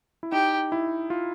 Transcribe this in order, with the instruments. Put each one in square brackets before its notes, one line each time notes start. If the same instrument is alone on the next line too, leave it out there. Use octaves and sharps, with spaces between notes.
[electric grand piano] E4
[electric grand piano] D#4 [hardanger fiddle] G4
[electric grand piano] E4
F4